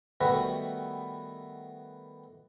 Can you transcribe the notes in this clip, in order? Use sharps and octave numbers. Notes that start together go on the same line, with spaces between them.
D#3 G3 A3 B3 F#4 B4